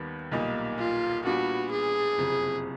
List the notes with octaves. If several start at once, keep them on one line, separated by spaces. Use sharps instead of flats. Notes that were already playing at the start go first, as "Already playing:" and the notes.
Already playing: D#2 D#3 G3 B3
B1 A#2 G3 A#3 D#4
F4
A#2 G3 B3 D4 F4 F#4
G#4
F#1 F2 C3